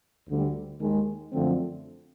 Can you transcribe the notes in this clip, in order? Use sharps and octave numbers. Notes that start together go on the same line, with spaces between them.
D2 D3 G3
D#2 D#3 G#3
F#2 D3 F3 A3 C4